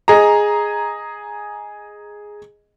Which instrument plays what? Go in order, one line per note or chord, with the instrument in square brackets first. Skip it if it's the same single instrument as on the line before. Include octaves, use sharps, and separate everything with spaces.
[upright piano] G#4 D#5 A#5